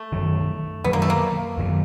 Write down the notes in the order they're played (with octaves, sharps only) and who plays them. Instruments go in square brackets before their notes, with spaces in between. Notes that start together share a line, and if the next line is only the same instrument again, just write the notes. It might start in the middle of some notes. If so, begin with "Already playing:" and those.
Already playing: [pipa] A3
[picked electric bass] F#2 D#3 F#3
[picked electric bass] F#2 D#3 F#3 [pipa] B3
[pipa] A#3
A3
A#3
[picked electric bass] F#2 D#3 F#3